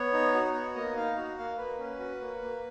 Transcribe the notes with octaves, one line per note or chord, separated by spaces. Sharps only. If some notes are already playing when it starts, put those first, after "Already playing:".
Already playing: B3 C#5
D#4
F#4
B3
A#3 D#5
D#4 F5
F#4
A#3 F5
A#3 B4
C#4
F#4
A#3
A#3